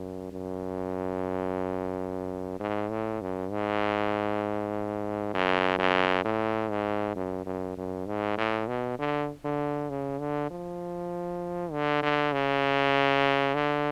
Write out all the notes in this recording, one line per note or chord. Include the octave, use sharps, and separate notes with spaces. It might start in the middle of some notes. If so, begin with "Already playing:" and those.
Already playing: F#2
F#2
G#2
A2
F#2
G#2
F#2
F#2
A2
G#2
F#2
F#2
F#2
G#2
A2
B2
D3
D3
C#3
D3
F3
D3
D3
C#3
D3